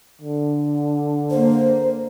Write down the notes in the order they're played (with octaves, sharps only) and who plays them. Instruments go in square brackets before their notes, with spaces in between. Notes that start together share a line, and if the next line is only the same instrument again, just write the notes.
[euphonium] D3
[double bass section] A#3 [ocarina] C5